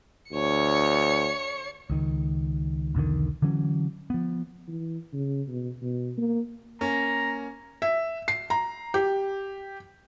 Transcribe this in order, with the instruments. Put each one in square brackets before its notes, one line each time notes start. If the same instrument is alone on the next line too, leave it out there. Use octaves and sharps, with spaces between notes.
[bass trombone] D2 [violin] C#5 C#7
[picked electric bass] C#2 D#3
B1 E2 D3 D#3
D3 E3 F#3 C#4
F3 B3
[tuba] E3
C#3
B2
B2
A#3
[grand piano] A#3 C#4 [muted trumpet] A#5
[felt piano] E5
C7
A#5
G4